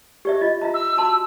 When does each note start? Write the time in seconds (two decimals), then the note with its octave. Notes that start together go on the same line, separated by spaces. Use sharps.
0.25 G4 D5 E5
0.41 F4 D#5
0.62 F4 E5 A#5
0.74 E6
0.97 F#4 A5 C6